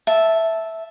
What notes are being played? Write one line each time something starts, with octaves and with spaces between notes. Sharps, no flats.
E5 A5